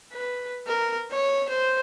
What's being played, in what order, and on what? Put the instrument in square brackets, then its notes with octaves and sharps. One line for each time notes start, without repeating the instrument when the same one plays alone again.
[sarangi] B4
A#4
C#5
C5